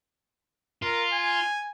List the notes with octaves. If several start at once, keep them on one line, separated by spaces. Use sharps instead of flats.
F4 A#4
G#5